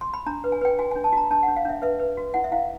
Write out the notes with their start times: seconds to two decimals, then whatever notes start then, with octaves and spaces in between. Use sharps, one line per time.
0.01 C6
0.14 B5
0.26 D4 A#5
0.44 B4
0.52 G#5
0.61 B4 G5
0.79 F#4 G#5
0.91 G#5
0.96 D4
1.04 A5
1.12 F#4 A#5
1.31 D4 A5
1.43 F#5
1.48 D4
1.56 F5
1.65 D4 E5
1.82 B4 E5
2.00 B4
2.17 F#4
2.34 E4 F#5
2.44 E5
2.52 E4 F5